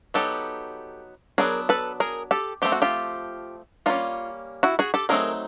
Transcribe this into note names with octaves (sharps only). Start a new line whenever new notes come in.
F#3 B3 D#4 G4 A4
F#3 B3 D4 G#4 A#4
A4 B4
G#4 A#4
G4 A4
F3 A3 C4 G4
F#4
F4 G4
G3 A#3 C#4 D#4 F4
E4 F#4
F#4 G#4
G4 A4
F#3 A3 C4 D#4 G#4 A#4